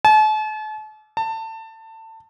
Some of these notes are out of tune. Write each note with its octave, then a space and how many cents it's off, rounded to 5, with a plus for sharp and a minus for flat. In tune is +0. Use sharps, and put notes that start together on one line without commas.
A5 -40
A5 +25